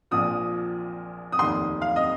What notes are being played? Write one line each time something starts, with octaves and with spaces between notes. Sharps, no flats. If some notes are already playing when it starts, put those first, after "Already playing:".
A#1 A#2 F3 D#6
D#6
F1 D#2 D#3 C6
F5
D#5